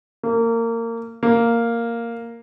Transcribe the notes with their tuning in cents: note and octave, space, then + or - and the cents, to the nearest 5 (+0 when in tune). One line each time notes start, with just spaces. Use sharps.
A#3 -25
A#3 -5